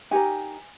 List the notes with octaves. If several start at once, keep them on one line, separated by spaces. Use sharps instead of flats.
D#4 G4 A#4 G#5